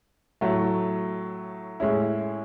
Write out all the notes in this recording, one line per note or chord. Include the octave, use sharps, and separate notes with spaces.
A2 F#3 A3
A2 G#3 C#4 E4